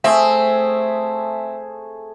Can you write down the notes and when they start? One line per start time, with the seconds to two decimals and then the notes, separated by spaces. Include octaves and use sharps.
0.04 A3 C4 G#4 E5